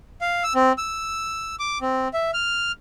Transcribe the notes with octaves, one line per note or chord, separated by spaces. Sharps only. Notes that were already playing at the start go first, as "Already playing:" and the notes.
F5
E6
C4
E6
D6
C4
E5
F6